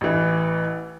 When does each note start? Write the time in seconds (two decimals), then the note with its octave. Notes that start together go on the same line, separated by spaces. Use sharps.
0.01 A1 E3